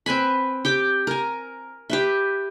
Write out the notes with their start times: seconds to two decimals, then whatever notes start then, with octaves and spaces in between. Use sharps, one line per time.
0.06 C4 B4 G#5 B5
0.65 G4 G5 D6
1.07 A#4 G#5
1.90 G4 B4 E5